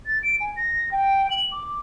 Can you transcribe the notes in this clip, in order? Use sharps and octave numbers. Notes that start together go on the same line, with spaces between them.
A6
D7
G#5
A#6
G5
F#7
D6